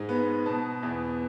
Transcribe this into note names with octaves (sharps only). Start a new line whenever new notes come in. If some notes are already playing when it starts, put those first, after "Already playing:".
Already playing: G#2 G#3
B3
B2 A5
E2